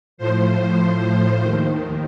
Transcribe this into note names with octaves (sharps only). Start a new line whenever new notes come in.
A2 F3 C5
D#2 D#3